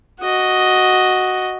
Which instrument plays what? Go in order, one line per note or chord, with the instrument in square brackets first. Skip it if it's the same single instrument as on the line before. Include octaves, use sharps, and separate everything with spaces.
[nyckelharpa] F#4 D#5